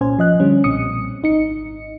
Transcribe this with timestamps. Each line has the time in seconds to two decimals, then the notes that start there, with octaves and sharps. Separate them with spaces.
0.01 C2 A#2 C#4 C5 G#5
0.17 G1 F3 D#5 F#6
0.40 D3 G3 C#4
0.64 B1 A#2 C4 D#6 C#7
1.22 G#1 D#4 C#7